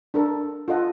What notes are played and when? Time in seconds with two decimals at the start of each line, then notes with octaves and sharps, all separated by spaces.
0.14 D4 A4 A#4
0.68 F4 A4 D#5 F#5